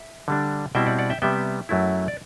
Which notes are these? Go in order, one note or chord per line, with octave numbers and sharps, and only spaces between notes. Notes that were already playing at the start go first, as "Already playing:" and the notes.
Already playing: E5
D3 G3 D4
B2 G3 C4 E4 E5 G5
D5 F#5
D5 F#5
E5 G5
C3 G3 B3 E5 G5
F#2 F#3 A3 E4
D5